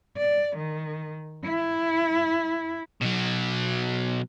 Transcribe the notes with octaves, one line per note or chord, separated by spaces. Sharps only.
D5
D#3
E4
B2 F#3